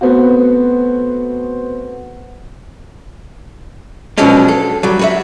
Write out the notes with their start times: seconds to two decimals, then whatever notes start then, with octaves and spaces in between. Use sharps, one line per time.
0.01 A3 B3 C4 F#4
4.18 B2 F3 F#3 G#3 C#4 D4
4.48 A4
4.83 F#3 G3
4.99 F#4 B4 E5